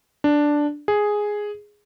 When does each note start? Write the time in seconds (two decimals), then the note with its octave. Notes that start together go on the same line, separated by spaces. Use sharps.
0.24 D4
0.88 G#4